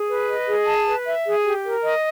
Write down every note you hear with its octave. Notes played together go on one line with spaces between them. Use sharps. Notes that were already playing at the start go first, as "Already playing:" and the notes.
Already playing: G#4
B4
D#5
G#4
A5
B4
E5
G#4
G4
A#4
D#5